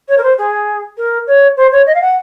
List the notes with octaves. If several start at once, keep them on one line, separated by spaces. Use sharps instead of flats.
C#5
A#4
C5
G#4
A#4
C#5
C5
C#5
D#5
F5
F#5